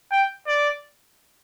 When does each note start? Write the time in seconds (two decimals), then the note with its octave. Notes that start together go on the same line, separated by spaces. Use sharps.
0.12 G5
0.47 D5